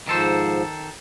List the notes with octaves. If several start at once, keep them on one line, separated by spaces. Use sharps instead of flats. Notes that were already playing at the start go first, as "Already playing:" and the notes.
G#2 D#3 F3 A4 C5